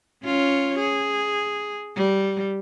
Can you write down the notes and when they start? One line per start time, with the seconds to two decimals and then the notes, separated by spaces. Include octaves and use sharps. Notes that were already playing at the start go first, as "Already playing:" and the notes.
0.23 C#4 F4 C#5
0.79 G#4
1.96 G3